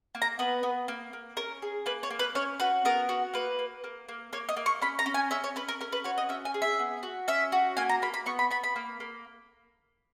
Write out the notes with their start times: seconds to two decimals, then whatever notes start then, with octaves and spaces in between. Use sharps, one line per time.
0.15 A#3
0.22 A#5
0.39 B3 B4
0.63 B3
0.88 A#3
1.13 A#3
1.37 C#4 A#4
1.62 G#4
1.86 A#3 B4
2.03 C#5
2.10 A#3
2.19 B4
2.35 C#4 C#5
2.60 F#4 B4
2.85 B3 A#4
3.09 F#4
3.33 A#3 B4
3.59 A#3
3.84 A#3
4.09 A#3
4.33 A#3 C#5
4.49 D#5
4.57 A#3
4.66 C#6
4.81 C#4 B5
4.99 A#5
5.06 C#4
5.14 G#5
5.31 C#4 E5
5.44 C#5
5.56 C#4 B4
5.68 A#4
5.81 C#4 A#4
5.92 B4
6.04 F#4 C#5
6.18 D#5
6.29 C#4 E5
6.45 G#5
6.54 G#4
6.62 E5
6.79 B3
7.03 F#4
7.28 C#4 E5
7.52 F#4
7.77 A#3 G#5
7.89 A#5
8.02 A#3 B5
8.14 B5
8.26 B3 C#6
8.39 B5
8.50 B3 B5
8.64 B5
8.76 A#3
9.00 A#3